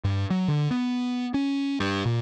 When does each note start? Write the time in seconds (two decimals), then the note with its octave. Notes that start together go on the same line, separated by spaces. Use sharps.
0.04 G2
0.30 F#3
0.48 D3
0.71 B3
1.34 C#4
1.80 G2
2.05 A#2